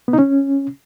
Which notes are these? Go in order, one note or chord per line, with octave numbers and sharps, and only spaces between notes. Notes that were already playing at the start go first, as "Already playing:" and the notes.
B3
D#4
C#4